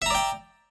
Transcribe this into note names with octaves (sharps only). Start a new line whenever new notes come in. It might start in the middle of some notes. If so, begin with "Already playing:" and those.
D5 E5 G5 A#5